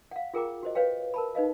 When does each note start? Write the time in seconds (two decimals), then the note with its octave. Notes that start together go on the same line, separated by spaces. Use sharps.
0.11 F5 F#5
0.34 F4 G#4 A#4 G5 A#5 D6
0.63 F#4 C5 D#5
0.75 B4 C#5 F5 G5
1.14 A#4 A5 B5
1.35 D#4 B4 D#5 F5